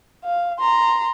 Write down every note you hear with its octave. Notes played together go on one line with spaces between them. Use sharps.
F5
A#5 C6